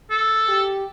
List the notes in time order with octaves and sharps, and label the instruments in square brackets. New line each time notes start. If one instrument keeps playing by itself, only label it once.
[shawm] A4
[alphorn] G4